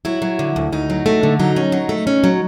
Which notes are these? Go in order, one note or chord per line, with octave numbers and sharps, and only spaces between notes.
F#3 E4
F#3
D3
D2
D2 D#4
F#3
A3
D3
F#3 D#4
C#4
F#3
A3
C#4
F#3